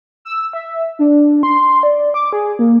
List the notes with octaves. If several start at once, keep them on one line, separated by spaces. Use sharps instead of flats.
E6
E5
D4
C6
D5
D6
G#4
A#3